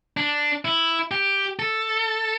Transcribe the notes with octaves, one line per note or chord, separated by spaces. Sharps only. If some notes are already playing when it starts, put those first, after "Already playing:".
D4
E4
G4
A4